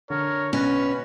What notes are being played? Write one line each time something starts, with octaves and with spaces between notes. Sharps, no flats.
D3 A#4 C#5
B2 C#4 F#4 B4